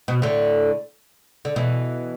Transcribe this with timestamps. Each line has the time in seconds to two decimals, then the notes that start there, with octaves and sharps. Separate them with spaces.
0.08 B2
0.22 A2 D3
1.45 D3
1.56 B2 E3